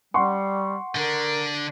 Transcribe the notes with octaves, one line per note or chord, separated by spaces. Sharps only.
G3 F#5 C6 C#6
D3 D4 A#4